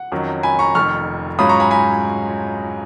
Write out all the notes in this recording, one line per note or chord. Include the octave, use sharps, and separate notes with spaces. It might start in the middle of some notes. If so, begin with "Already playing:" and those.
Already playing: F#5
F2 D#3 F#3 C#4
G#5 B5
A#5 C#6
F1 F2 D#3 C#6 F6
G#2 F#3 C#4 F4 B5 D#6
A#5 C#6
G#5 B5
G#5 B5